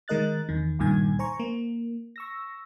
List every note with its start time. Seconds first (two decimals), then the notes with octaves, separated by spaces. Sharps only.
0.08 D#3 G#3 A#4 D#5 F#6 A6
0.49 E2 D#3
0.79 C#2 G2 A#2 D#3 G#5 G#6
1.19 C5 G#5 A#5 C#6
1.40 A#3
2.16 C#6 E6 A#6